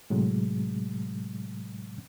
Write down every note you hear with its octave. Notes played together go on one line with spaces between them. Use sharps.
A2 C3 F#3 G#3